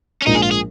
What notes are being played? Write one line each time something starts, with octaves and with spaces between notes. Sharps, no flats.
C#4
A#1 G#2 F3 A#3 D#4
G#4
F4
G#4